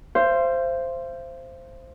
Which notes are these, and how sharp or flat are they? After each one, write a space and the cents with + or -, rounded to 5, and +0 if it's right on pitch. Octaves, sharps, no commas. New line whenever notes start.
C5 +0 F5 -45